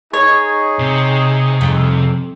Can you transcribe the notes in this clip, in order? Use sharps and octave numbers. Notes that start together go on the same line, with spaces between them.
D#4 G#4 C#5
C3
F2